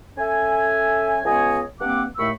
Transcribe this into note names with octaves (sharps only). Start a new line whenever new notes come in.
C#4 A4 E5 G#5
C#2 B3 C#5 D#5 G#5
G2 A#3 C4 F#5 D6
D#2 A2 A3 B5 C#6 E6